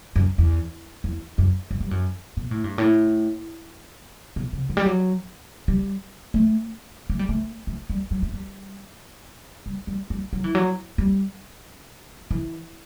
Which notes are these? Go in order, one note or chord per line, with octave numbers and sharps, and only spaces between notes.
F#2
E2
E2
F#2
F#2
G2
F#2
B2
A2
G2
A2
B2
C3
E3
G3
F#3
G3
A3
A3
G3
A3
A3
G3
F#3
A3
G3
G3
G3
G3
F#3
E3
F#3
G3
E3